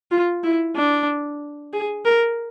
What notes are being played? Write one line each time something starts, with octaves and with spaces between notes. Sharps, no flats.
F4
E4
D4
G#4
A#4